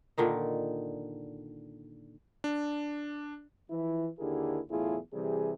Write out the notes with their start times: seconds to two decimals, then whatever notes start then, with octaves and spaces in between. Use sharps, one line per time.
0.18 A#2 D3 D#3 D#4
2.44 D4
3.71 E3 F3 E4
4.20 D#2 D3 E4 G4 G#4 A#4
4.70 B1 E2 A2 E4 F4 G#4
5.13 C3 E3 G3 G#4